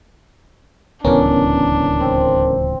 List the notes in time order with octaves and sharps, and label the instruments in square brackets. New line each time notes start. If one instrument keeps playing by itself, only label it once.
[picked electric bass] D1 C#2 E3 [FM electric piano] B3 C#4 A#4 [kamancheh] D4
[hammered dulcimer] C4